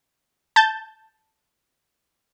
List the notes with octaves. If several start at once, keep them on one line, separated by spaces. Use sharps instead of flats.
A5 G6 A6